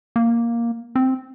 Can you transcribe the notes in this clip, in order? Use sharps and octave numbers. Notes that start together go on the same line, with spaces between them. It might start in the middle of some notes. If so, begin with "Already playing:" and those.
A#3
C4